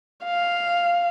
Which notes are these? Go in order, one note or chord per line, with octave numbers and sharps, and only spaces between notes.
F5